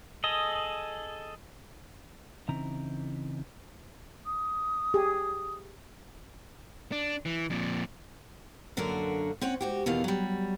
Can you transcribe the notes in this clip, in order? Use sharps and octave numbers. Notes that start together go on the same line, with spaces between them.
G#4 A4 D#5
C#3 E3 C4 D#4 E4 A#5
D#6
G4 G#4
D4
E3
F2 A#2
F#2 D3 A#3 D4 F#4 A#4
C4 C#4 C#5 F#5
G#2 F#4 G4
E2 B2 D#3 G#4 F5
F#3 G3